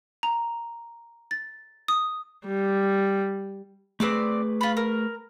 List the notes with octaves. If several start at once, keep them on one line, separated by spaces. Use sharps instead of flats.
A#5
A6
D#6
G3
A3 C4 G#4 B4 D5 D6
F4 B5
A#4